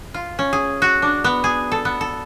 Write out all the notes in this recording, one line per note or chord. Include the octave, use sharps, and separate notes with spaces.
F4
C#4
G#4
F#4
D4
B3
G#4
A4
B3
A4